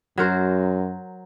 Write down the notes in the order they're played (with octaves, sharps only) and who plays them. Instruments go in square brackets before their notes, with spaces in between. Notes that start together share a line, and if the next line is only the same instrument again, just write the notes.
[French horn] F#2 [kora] F#3 A#4 C5